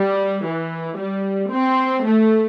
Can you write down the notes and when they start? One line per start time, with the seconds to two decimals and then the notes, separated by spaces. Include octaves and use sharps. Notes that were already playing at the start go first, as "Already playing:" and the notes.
Already playing: G3
0.46 E3
0.98 G3
1.52 C4
2.05 A3